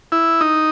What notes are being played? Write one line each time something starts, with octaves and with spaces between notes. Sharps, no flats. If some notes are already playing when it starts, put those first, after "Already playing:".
E4
D#4